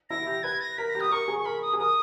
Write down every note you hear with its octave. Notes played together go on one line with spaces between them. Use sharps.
E4 A#6
G4
B4 G#6
A#6
A#4 B6
A#6
G4
D#6
A#4 C#6
G#4
C#6
A#4 B5
D#6
G#4
A#4 D#6